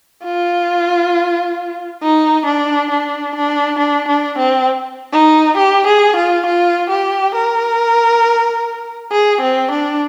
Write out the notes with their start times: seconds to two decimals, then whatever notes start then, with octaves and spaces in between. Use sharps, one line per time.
0.24 F4
2.02 D#4
2.46 D4
2.91 D4
3.36 D4
3.79 D4
4.08 D4
4.38 C4
5.13 D#4
5.58 G4
5.87 G#4
6.16 F4
6.46 F4
6.90 G4
7.35 A#4
9.12 G#4
9.42 C4
9.71 D4